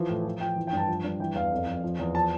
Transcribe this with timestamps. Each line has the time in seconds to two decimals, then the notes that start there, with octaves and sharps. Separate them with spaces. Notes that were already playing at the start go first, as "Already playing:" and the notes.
Already playing: E3 F3
0.09 A2
0.25 F3
0.40 F3 G5
0.56 E3
0.67 G5
0.73 G2 A5
0.88 F3
1.04 G2
1.20 E3 G5
1.35 E2 F5
1.51 F2
1.67 F2
1.83 F3
1.99 E2
2.14 F3 A5